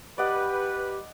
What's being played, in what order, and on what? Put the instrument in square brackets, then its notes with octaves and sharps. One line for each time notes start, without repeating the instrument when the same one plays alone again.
[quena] G4 [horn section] B4 [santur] D5 D#5 F#5